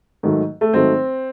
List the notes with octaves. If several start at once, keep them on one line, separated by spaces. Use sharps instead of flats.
G#2 D#3 F#3 A3
A3
G#2 D#3 F#3 A3 C4